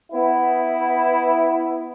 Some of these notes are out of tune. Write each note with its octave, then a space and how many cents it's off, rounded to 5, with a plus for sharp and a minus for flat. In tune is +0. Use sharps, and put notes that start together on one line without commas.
B3 +15 E4 +0